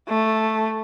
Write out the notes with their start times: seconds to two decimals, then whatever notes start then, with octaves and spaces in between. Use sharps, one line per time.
0.08 A3